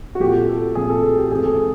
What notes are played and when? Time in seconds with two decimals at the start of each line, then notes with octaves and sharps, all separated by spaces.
0.15 F#4
0.20 A#2 F3 A3 C4 G4
0.49 A4
0.75 A#2 F3 A3 C4 G#4
0.89 A4
1.03 G#4
1.18 G4
1.31 G#2 E3 A3 C4 G#4
1.39 A4
1.46 G#4